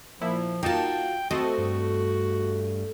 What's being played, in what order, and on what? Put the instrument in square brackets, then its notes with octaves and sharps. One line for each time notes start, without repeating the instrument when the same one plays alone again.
[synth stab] A#2 E4 [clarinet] F3
[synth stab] A#3 D#4 A5 [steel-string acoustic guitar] F4 F#4 [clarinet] G5
[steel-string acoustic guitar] A3 [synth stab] C4 A4 D#5 [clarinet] F#4
[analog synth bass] G2